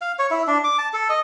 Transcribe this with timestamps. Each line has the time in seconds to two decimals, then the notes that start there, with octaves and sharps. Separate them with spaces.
0.01 F5
0.19 C#5
0.31 E4
0.47 D4
0.64 D6
0.78 A5
0.93 A4
1.10 D#5